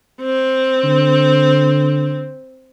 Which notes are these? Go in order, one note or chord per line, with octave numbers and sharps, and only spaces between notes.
C4
D3